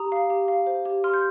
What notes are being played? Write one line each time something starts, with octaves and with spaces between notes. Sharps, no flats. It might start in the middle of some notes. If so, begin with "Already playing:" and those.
Already playing: G4 A#5 D#6
F5
G4
F5
C5
G4
G4 C6 F6
G6